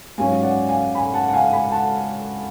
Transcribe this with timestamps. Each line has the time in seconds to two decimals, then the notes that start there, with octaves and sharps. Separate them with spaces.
0.18 G#2 F#3 C#4 F5 G#5
0.43 D5 F#5
0.69 F5 G#5
0.95 G#5 B5
1.14 F#5 A5
1.28 F#5
1.33 F5 G#5
1.53 G#5 B5
1.71 F#5 A5